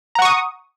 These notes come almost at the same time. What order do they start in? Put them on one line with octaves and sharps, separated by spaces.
A#5 F#5 C#6 D#6